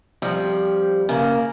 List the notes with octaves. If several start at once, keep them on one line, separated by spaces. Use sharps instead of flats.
F2 F3 G3
C#3 A#3